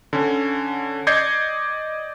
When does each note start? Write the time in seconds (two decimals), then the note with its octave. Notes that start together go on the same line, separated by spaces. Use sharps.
0.13 D3 C#4
1.07 D5 D#5 G6 G#6 C7 C#7